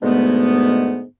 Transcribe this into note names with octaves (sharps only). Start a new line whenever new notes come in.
G#2 B2 D3 G#3 A3 B3